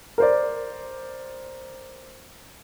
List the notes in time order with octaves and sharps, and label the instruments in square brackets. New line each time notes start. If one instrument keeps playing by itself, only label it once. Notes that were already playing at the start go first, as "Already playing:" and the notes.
[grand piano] A#4 C5 D5